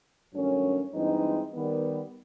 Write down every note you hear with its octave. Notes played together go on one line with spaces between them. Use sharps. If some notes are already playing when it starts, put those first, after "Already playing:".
G2 D#3 F#3 A3 C#4
G2 E3 G#3 C4 D#4
D#3 G3 B3